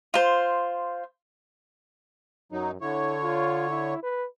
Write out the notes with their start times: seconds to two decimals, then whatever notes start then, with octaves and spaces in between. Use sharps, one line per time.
0.14 F4 C5
2.52 F#2 F#3 D#4
2.81 D3 E4 C#5
3.23 F4
3.70 E4
4.03 B4